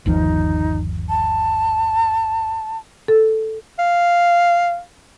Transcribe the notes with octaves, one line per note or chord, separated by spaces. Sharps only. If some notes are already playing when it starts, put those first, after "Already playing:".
G1 D#2 F3 D#4
A5
A4
F5